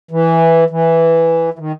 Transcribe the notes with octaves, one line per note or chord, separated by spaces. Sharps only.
E3
E3
E3
D#3